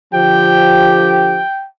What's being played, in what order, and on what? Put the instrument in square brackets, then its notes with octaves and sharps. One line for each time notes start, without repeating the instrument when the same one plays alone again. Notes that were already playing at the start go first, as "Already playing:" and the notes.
[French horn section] D3 F3 [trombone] G4 [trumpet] G5